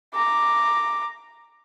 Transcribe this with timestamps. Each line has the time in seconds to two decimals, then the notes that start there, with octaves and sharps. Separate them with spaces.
0.14 A#5 D6